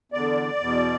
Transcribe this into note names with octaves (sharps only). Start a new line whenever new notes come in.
E2 D3 D5
E2 B2